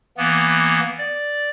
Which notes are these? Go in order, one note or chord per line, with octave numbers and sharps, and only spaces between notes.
E3 A#3 B3
D5